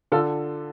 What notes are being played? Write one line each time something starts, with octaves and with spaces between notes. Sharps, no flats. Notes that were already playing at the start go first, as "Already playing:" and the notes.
D3 F4 A4